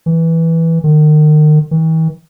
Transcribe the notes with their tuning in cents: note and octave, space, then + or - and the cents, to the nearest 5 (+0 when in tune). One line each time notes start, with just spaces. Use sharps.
E3 -5
D#3 -35
E3 -45